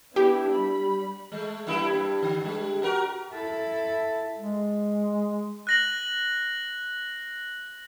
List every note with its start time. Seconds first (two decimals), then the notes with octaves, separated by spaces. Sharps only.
0.16 B3 D4 E4 G4
0.50 G3 B5
1.32 G#3 A3
1.67 G2 A#3 E4
1.93 G2
2.23 D3
2.41 G2 G#3
2.83 F#4 A#4
3.33 E4 A4
4.37 G#3
5.67 F#6 A#6 F#7